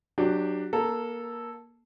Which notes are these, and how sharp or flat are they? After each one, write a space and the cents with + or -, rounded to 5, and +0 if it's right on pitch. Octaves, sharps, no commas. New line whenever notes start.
F#3 +0 D4 +20 G4 +0
A#3 +20 A4 +0 A#5 +0